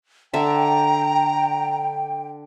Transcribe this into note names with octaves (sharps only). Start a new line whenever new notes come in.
D3 E5 G5 A#5